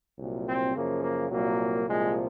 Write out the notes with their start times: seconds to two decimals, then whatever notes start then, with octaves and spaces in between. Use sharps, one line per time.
0.18 C2 A#2 F#3
0.46 C4
0.75 F#2 C#3 F3 A#3
1.02 A#3
1.30 C2 A#2 F#3 A#3
1.86 C2 A#2 F3 G#3